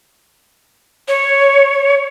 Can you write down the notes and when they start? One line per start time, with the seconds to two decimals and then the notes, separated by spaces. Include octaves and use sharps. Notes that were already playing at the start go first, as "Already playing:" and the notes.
1.08 C#5